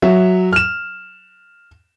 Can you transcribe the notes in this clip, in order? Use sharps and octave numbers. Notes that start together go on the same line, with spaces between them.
F#3 F#4 E5
F6 E7